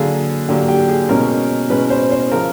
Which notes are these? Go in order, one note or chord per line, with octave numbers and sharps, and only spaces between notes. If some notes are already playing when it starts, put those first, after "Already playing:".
Already playing: D3 F#3 A#3 G#4
D3 F#3 A#3 G4
G4
G#4
B2 G#3 C#4 A#4
B2 G#3 C#4 B4
C5
C5
C#3 F3 A#4